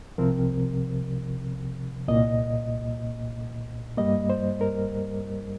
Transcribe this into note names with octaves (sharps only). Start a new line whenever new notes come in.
C2 C3 F3 C4 A#4
C2 A#2 A#3 D#5
G2 G3 A#3 D#5
C5
A#4